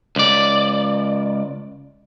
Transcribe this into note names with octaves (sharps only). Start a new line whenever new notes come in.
C#2 D5